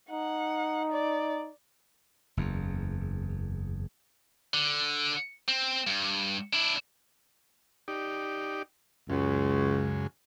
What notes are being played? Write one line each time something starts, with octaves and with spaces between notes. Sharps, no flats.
D#4 F#5
D5
F#1 E2
D3
C4
G2
D4 E4
D#4 G4 D5
C#2 F#2 C#3 G#3